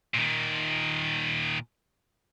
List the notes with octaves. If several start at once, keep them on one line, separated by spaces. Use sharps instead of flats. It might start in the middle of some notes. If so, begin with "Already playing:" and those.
A#2 D#3